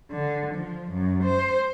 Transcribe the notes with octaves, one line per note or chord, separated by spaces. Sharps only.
D3
F3
F#2
C5